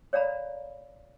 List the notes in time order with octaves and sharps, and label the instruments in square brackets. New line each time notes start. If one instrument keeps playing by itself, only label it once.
[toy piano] C#5 D5 F5 A#5 B5